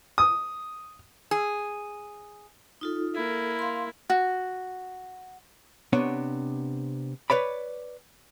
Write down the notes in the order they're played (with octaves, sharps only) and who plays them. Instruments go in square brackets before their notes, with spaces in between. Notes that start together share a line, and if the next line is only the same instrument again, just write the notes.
[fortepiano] D#6
[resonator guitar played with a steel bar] G#4
[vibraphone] D#4 F4 A4
[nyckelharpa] A#3 E4 [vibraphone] A4
[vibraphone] F5 C6
[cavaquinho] F#4
[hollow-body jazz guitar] C3 B3 D4 C#5 F#5
B4 C#5 D5 B5